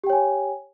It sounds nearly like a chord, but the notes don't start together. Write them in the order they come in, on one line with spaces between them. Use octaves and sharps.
G4 G5 C#5 G#5